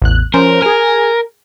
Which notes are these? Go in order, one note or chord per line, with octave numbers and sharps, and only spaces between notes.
A1 E2 F#6
F3 C#4 A#4 C5
G#4 A#4 G#5